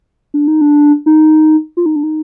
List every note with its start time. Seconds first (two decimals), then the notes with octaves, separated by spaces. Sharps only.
0.34 D4
0.48 D#4
0.61 D4
1.06 D#4
1.77 F4
1.86 D#4
1.96 D4
2.03 D#4